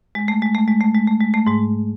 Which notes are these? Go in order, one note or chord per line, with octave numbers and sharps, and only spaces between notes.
G#3
A3
G#3
A3
G#3
A3
G#3
A3
G#3
A3
G#2 G#3